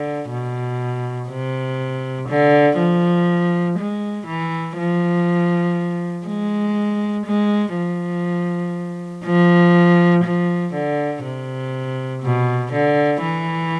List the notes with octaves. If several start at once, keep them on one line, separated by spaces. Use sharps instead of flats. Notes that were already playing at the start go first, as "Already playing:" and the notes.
Already playing: D3
B2
C3
D3
F3
G#3
E3
F3
G#3
G#3
F3
F3
F3
D3
C3
B2
D3
E3